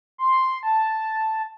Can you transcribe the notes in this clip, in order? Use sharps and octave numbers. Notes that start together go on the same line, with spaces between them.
C6
A5